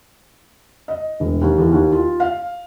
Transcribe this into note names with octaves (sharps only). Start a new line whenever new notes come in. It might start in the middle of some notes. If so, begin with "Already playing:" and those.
D#5
E1
D#2
E2
D#2
F4
F5